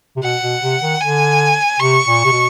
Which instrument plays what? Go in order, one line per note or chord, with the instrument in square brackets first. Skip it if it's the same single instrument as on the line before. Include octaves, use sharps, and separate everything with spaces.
[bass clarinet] C3
[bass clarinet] B2 [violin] F#5
[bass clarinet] B2
C3
D#3
[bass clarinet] D3 [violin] G#5
[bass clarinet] C3 [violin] C#6
[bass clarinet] A#2
C3
B2